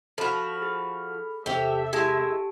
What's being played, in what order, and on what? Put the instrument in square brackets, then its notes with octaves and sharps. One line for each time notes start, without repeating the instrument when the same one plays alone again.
[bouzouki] F3 F#4 [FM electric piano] A4 B5 F6
[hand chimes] G#4
[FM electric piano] E2 C3 C4 [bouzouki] G4 G5 [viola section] A4 E5
[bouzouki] G#3 E4 [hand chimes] G4 G#5 A5